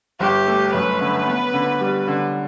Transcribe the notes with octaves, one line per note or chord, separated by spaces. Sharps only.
G1 G4
A3
F#2 B4
D3
B3
D3
G3
D3